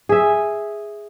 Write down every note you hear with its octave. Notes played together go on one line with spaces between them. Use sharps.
G#4 E5